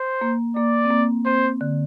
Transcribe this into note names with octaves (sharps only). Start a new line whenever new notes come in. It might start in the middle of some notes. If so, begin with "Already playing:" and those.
Already playing: C5
A#3
A#3 D5
C4
A#3
C4 C5
D3